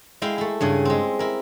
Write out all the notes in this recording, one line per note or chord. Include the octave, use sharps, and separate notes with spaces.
G#3 E4 F5 G5
A3 E4
G2 C#3 G#4
G#3 C4
E4 A#4